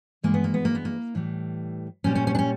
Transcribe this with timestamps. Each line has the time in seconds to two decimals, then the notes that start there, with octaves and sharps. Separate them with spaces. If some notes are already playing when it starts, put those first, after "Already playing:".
0.23 G2 E3 G#3 A#3
0.34 B3
0.44 A#3
0.54 B3
0.65 A#3
0.75 B3
0.85 A#3
1.15 A2 E3 G3
2.04 A#2 G3 C#4
2.15 C#4
2.27 C#4
2.35 D4
2.39 C#4